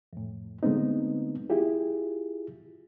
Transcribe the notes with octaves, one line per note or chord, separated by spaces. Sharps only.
F2 A2
D3 G#3 A3 B3 C4 D#4
E4 F4 G4 G#4